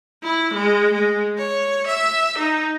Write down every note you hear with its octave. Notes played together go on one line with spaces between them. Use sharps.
E4
G#3
G#3
C#5
E5
D#4